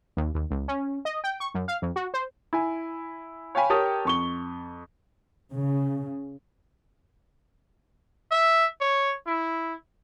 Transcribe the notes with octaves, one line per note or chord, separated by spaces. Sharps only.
D#2
D#2
C#2
C#4
D#5
G5
C#6
F#2
F5
F2
F#4
C5
E4 G#5
C#5 F5 G5 G#5 B5
G4 A#4 C#5 G5 A5 D#6
F2 C#6 G7
C#3
E5
C#5
E4